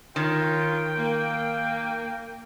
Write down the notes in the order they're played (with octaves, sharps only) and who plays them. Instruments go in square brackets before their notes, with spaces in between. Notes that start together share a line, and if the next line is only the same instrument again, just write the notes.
[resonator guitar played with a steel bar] D#3 [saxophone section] F4 C#5 [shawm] G5
[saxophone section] A#3